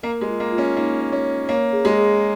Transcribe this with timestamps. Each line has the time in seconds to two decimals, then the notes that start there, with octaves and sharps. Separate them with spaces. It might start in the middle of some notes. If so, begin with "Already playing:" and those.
0.03 A#3 A#4
0.21 G#3
0.28 F4
0.40 A#3
0.52 F4
0.58 C#4
0.76 A#3 D#4
1.01 C#5
1.12 C#4
1.25 C#5
1.48 A#3 C#5
1.73 G#4
1.85 G#3
1.98 G#4